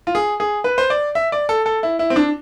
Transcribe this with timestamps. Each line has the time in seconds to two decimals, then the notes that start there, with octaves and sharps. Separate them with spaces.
0.07 F4
0.15 G#4
0.40 G#4
0.64 B4
0.78 C5
0.90 D5
1.15 E5
1.32 D5
1.49 A4
1.66 A4
1.83 E4
1.99 E4
2.10 C4
2.16 D4